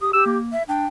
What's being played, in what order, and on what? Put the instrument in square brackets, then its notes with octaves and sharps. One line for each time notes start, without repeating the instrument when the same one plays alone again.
[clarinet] G4 [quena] D#6
[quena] G4 [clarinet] E6
[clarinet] A#3
[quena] E5
[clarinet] D4 [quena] G5